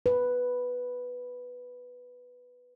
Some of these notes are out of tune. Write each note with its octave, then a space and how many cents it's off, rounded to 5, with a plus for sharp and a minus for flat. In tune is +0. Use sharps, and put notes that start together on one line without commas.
B4 +0